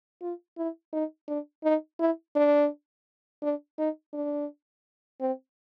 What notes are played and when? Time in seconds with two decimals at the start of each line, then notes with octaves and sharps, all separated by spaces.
0.22 F4
0.58 E4
0.93 D#4
1.28 D4
1.64 D#4
1.99 E4
2.36 D4
3.42 D4
3.78 D#4
4.13 D4
5.20 C4